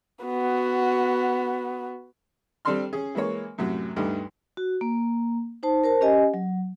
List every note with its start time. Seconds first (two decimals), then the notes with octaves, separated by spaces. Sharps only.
0.25 B3 F#4
2.65 G3 C4 D4 A4 C6 F6
2.93 C#4 G#4
3.15 E3 G#3 A#3 C#5
3.58 F#2 A2 C3 F#3
3.96 D2 G2 D3 G3 A3 D#4
4.57 F#4
4.81 A#3
5.63 D#4 C5 A5
5.84 A#4 C5 A5
6.01 C#4 G4 D#5 G#5
6.34 F#3